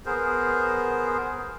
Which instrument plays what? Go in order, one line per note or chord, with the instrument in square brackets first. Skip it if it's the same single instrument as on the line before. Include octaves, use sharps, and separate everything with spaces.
[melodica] B3 G#4 A#4 C5